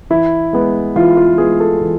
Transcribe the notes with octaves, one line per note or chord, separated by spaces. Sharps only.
E3 E4
G#3 B3
E3 F4
F4
G#3 B3 G#4
A4
E3